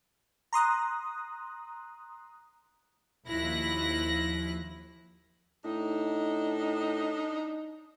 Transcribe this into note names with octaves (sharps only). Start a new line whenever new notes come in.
A#5 C6 D#6 F#6
D#2 F3 E4 F#6 A#6
A2 D4 D#4